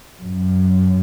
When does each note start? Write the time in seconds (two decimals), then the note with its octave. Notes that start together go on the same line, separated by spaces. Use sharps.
0.21 F#2